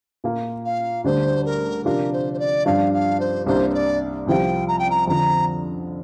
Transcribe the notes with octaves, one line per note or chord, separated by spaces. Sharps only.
A#2 A#3 F4
F5
D2 D3 G3 D4 C5
A#4
C3 F3 D4 F4 A#4
C5
C5
D5
G2 F3 D4 F4 F5
F5
C5
C2 C3 A#3 D4 C5
C5
D5
C2 C3 F3 C4 F4 G5
A#5
G5
A#5
F2 D3 F3 A#5